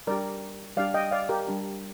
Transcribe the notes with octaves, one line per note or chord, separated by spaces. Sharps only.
G3 D4 G4 A#4 D5
G3 D4 G4 D5 F5
D#5 G5
D5 F5
G4 A#4
G3 D4 G4